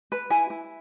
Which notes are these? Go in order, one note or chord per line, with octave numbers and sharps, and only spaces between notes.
B4
E4 G#5
E4